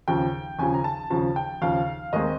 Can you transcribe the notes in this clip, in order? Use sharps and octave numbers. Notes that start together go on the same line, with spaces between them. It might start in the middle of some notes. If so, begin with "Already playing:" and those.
D#2 C#3 F3 G5
D#2 C#3 F3 G#5
A#5
A5
D#2 C#3 F3 A5
G5
D#2 C#3 F3 F5
D#2 D#3 G#3 C4 D#5